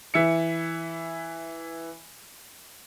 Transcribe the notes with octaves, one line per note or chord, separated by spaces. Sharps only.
E3 E5 C#7